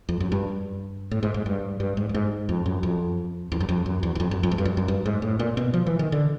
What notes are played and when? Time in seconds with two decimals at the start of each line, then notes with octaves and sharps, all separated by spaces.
0.09 F2
0.20 F#2
0.32 G2
1.11 A2
1.23 G#2
1.34 G#2
1.46 G2
1.80 G2
1.97 G#2
2.09 G2
2.15 G#2
2.49 F2
2.66 F#2
2.83 F2
3.52 E2
3.60 F#2
3.69 F2
3.86 F#2
4.03 E2
4.15 E2
4.20 F2
4.31 F#2
4.43 F2
4.52 G#2
4.58 G2
4.65 F#2
4.77 F#2
4.88 G2
5.06 G#2
5.22 A2
5.39 A#2
5.57 B2
5.74 F3
5.86 E3
5.99 D#3
6.12 D3